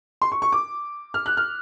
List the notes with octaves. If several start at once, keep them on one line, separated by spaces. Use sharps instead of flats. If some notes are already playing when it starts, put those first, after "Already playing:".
C6
C#6
C#6
D6
F6
F#6
F6